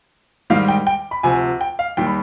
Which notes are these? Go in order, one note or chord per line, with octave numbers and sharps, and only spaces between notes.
G#2 D#3 G3 F5
G5
G5
B5
D2 C3 F3 G#5
G5
F5
D#2 D#3 G3 G5
B5